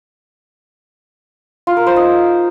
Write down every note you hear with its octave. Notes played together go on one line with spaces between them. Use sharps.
F4
A#4
C5
D#4